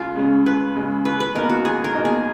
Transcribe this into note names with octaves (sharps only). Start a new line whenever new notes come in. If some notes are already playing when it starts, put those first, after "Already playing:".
Already playing: C#2 F4
C#3 G#3 C#4
C#2 B4
C#3 G#3 C#4
C#2 B4
B4
B2 A#3 D#4 A#4
F#4
C#2 G#4
A#4
B2 A#3 D#4
G#4